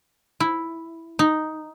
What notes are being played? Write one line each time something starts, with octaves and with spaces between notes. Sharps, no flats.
E4
D#4